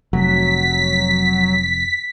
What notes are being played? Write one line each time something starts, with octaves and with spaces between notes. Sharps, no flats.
F1 F#3 B6